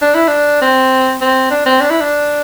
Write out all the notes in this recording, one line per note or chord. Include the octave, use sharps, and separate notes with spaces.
D4
E4
D4
C4
C4
D4
C4
D4
E4
D4